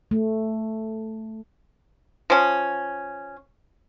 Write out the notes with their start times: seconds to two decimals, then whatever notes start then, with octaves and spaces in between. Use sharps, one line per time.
0.11 A3
2.30 F3 C#4